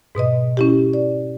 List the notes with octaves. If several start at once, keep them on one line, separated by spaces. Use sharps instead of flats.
G#2 B2 B4 D#5
C#4 E4 G4
D5